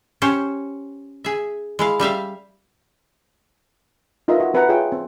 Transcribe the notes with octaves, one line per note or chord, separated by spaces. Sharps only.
C#4 G4 C5 C#5
G#4 E5
G#3 E4 F5
G3 G4 E5 F5
D#4 F4 A#4 B4 D#5 E5
F#4
C4 B4 E5 F#5 A#5
F4 G#4 C#5 E5 G5
C4